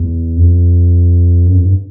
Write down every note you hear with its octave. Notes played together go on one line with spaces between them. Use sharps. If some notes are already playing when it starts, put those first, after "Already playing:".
Already playing: E2
F2
F#2
F2
G2